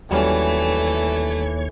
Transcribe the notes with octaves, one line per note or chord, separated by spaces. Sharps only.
D#2 E3 F#3 G3 A3 C#4 C#5